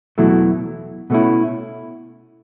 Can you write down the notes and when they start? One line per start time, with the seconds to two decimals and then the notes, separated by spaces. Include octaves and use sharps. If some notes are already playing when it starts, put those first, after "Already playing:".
0.18 E2 B2 F#3 A3 E4
1.10 B2 A3 C#4 E4